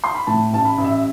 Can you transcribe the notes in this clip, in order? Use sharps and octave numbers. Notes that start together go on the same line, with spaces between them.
C6
B5
A2 A5
A1 A5
B5
A1
E5